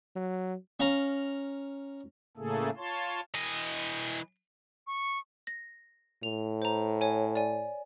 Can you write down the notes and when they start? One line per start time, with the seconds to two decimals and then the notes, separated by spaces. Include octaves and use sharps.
0.16 F#3
0.80 C#4 F5 A#5
2.37 A2 C#3 A3 A#3 G#4 A4
2.77 F4 C#5 A5 C6
3.34 E3 D#5
4.87 C#6
5.47 A#6
6.23 A2 F7
6.62 C5 A#5
7.01 C#5 G#5
7.35 D5 G#5